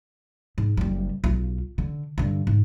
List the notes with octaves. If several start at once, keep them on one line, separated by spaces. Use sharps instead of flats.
G#2
F#1 G3
B1 F4
D3
G2 D3
G#2